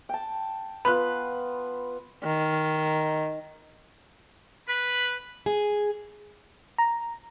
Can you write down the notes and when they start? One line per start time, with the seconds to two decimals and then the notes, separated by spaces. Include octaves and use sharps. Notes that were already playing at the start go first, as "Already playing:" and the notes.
0.09 G5 A5
0.85 B3 F4 B4 B5 F#6
2.24 D#3
4.68 B4 B5
5.46 G#4
6.78 A#5